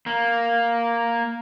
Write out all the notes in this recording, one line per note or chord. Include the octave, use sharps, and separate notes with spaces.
A#3